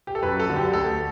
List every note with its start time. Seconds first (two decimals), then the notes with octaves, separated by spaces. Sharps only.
0.07 G4
0.15 A4
0.22 F#2 B4
0.40 A4
0.47 D3 F#3
0.56 G4
0.73 D2 A4